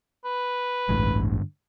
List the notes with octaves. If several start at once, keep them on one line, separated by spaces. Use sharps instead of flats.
B4
A1 D2 G2 D3 G#3